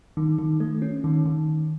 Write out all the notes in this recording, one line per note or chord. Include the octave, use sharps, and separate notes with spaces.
D#3
D#3
A3
C#4
D#3
D#3